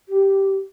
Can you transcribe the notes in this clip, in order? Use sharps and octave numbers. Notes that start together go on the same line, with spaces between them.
G4